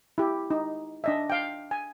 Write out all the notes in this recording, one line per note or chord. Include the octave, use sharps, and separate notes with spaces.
E4 G4
D#4
D4 D#5 E5
F5 G5
G#5